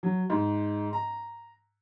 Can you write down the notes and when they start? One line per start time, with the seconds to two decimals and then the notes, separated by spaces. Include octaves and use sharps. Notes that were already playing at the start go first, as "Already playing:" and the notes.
0.03 F#3
0.30 G#2
0.93 A#5